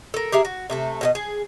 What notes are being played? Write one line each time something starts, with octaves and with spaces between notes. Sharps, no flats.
A4 A#4
G4 G#4 A#4 E5
F#4
C3 A3 A4
B2 A4 D#5
G#4